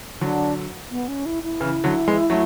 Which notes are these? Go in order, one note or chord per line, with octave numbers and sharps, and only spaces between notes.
D3 F#3 D4
B3
C#4
E4
E4
C#3 E3
D3 F#3
E3 G#3
F#3 A3